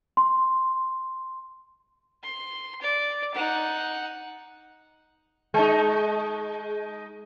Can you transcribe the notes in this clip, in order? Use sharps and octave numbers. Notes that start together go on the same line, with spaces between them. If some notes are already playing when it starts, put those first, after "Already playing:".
C6
C6
D5
D#4 F#5
G#3 D#4